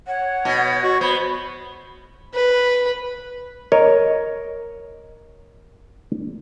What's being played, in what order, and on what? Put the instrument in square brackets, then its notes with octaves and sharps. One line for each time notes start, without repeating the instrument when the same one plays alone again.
[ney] C#5 [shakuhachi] F#5
[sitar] B2
[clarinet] F#4 [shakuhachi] D#5
[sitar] B3 [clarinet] C5 [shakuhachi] B5
[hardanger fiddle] B4
[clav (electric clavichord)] A#4 C#5 D#5